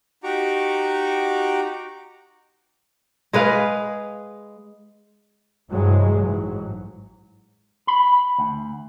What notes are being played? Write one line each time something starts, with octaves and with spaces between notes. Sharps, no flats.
D#4 F#4 G4 A#5 C#6 D6
G#3 G#4 B4 F5
G2 C3 E3 F#3 G#3
A1 G#2 F#3
B5
D2